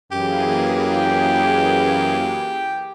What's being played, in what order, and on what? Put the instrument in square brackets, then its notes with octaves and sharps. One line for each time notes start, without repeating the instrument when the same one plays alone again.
[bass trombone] F#2 [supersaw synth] E3 A#3 G#4 [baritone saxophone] G4